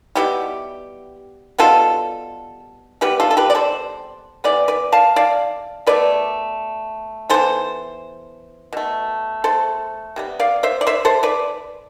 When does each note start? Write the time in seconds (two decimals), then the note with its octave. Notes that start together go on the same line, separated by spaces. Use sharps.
0.15 B2 G3 B3 E4 G4
1.58 B2 G3 B3 F4 A4
3.01 C3 G3 B3 G4 B4
3.20 F4 A4
3.31 A4
3.37 G4 B4
3.50 D5
3.55 A4 C5
4.44 C3 E3 B3 B4 D5
4.68 B4 D5
4.92 F5 A5
5.16 D5 F5
5.87 B2 A3 B4 D5
7.30 E3 B3 A4 C5
8.73 B2 A3
9.44 A4 C5
10.16 C3 G3 B3
10.40 D5 F5
10.63 C5 E5
10.81 D5
10.87 C5 E5
11.05 A4 C5
11.23 B4 D5